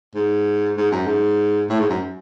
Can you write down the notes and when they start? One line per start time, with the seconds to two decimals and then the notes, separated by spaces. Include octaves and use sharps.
0.15 G#2
0.77 G#2
0.92 F#2
1.07 G#2
1.69 A2
1.80 G#2
1.90 F#2